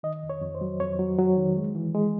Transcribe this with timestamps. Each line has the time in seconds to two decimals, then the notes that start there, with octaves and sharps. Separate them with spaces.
0.03 D#3 D#5
0.23 F2
0.30 C#5
0.42 F2
0.55 C5
0.61 F#3
0.80 F2 C#5
0.99 F#3
1.18 F#3
1.37 D#3
1.57 G#3
1.75 E3
1.94 G#3